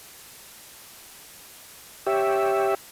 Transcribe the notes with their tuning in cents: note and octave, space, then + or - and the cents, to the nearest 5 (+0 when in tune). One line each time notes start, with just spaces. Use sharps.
G4 +0 C#5 +0 E5 +0